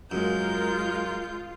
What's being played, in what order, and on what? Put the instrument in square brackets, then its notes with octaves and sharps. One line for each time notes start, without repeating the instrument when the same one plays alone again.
[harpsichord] F#2 [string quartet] G#3 G6 [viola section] F4 [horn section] A#4